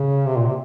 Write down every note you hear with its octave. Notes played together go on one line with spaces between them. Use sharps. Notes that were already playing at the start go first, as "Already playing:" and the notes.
Already playing: C#3
C3
A#2
C3